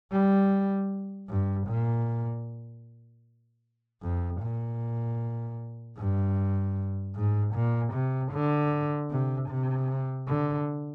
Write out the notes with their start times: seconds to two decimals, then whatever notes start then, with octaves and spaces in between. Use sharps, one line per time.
0.12 G3
1.29 G2
1.68 A#2
4.03 F2
4.41 A#2
5.98 G2
7.15 G#2
7.54 A#2
7.94 C3
8.32 D3
9.10 C3
9.49 C3
10.28 D3